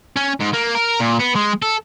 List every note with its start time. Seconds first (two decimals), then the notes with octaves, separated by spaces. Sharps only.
0.16 C#4
0.40 G#2
0.53 A#3
0.75 A#4
1.00 A#2
1.20 B3
1.35 G#3
1.62 A4